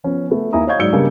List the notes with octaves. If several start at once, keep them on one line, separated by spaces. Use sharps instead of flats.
F3 B3 C#4
A3 B3
D#2 E4 G#5 A#5 D#6
C#5 D#5 F5 C#6 G6 G#6
G#2 F#3 D5 E6 C#7 G7
C#3 G3 G#3 A#3 B3 D4